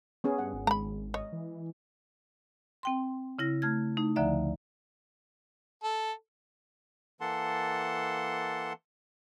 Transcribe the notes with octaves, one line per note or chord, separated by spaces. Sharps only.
B3 C#4 G#4
G2 F#5
G#1
G#3 A#5 B5
C#5 D#5
E3
C4 G5 C6
C#3 E4 A#6
A3 F6 G#6
A3 D#4
D2 D3 F3 D5 E5 A#5
A4
E3 A#3 A4 F#5 A5 C6